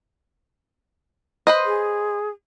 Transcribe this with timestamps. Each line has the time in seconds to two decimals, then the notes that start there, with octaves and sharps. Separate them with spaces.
1.47 B4 C5 D#5
1.65 G#4